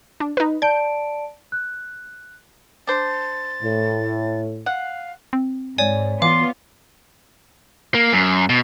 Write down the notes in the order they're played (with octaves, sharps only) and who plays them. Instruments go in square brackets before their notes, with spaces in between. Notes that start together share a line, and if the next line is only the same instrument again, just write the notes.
[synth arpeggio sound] D4
D#4 B4
[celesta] D5 A5 D7 [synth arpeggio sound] G6
[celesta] F#6
[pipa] D4 C5 [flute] A6
[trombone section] A2
[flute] F5 [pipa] F#5
[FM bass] C4
[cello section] G#2 [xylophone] C#5 D5 G#5
[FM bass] E3 [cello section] B3 F4 [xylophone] F5 D6 [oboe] C6
[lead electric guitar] A#3
F#2
B2